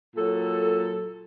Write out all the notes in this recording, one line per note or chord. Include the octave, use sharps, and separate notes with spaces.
A#2 F#3 A4